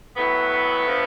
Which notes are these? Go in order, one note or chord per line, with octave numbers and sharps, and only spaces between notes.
A2 F#3 A3 B3
D3 F3